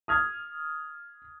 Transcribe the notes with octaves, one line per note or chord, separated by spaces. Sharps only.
D#6 F6 G#6